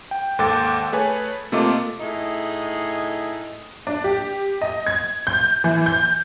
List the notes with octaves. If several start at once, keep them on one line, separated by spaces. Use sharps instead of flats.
G5
D#2 G#2 A4 G5 D6 A6
A3 G#4 B4 C#5 G#5
C3 A3 A#3 F4 D#5 D6
A2 D#4 G#4
D4
G4
D#5
G#6
G6
E3
G6